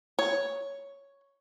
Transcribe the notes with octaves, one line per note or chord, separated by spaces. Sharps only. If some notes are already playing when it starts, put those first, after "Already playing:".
C#5